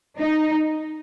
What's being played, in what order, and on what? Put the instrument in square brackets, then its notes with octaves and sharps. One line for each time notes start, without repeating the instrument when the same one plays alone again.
[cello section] D#4